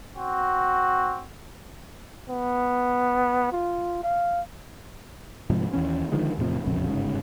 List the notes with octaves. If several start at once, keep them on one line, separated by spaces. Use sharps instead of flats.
C4 F#4
B3
F4
F5
G#2 C3 F3
D#2 E3 C#4
D3 D#3 F3 G#3
E2 A2 C3 F3
E1 A#1 F2 C#3
G1 G#2 C#3